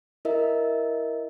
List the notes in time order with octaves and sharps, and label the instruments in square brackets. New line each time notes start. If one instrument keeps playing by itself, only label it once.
[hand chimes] E4 A#4 D#5 E5